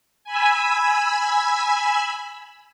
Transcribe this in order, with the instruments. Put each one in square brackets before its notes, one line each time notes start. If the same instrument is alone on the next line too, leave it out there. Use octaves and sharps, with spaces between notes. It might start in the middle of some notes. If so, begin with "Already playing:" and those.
[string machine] G#5 B5 E6